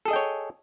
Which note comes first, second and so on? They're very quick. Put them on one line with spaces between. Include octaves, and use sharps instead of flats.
A4 G#4 D#5 G5 C#5